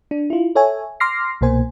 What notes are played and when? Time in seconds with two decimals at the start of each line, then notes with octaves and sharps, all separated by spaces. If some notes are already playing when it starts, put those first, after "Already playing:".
0.11 D4
0.30 E4 F4
0.55 A4 C#5 E5 G#5
1.00 C6 D6 F6 A#6 C7
1.41 C2 B2 A#3 C5 G#5